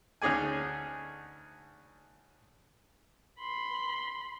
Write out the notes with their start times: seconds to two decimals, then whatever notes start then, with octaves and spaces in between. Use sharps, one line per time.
0.22 D2 C#4 D#4 G#4 D5 G#5
3.40 B5 C6